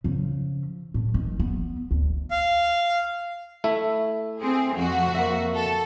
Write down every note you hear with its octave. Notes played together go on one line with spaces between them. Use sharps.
C#3 F3
A2
D#3 E3
B3
D2
F5
A3 E4 E5
C4 G#4
F2 F#4
A#3 E5
A4